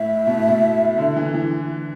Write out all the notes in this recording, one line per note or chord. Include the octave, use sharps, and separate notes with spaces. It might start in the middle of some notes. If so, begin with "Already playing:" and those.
Already playing: A2 E5
B2
A2
B2
D3
E3
E3